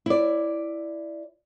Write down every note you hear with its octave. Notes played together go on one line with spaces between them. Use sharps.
E4 D5